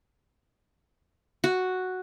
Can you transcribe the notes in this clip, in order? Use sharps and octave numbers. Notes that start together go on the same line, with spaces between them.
F#4